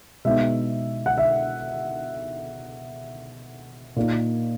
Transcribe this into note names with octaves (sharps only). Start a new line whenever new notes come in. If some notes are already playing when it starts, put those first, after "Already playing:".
B2 G#3 B3 D#4 E5
F#5
E5
A#2 A#3 D#4